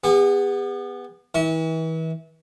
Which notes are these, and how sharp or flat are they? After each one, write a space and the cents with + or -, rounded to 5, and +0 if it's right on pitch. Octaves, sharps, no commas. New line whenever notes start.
B3 +0 G#4 -45
E3 -35 E5 -30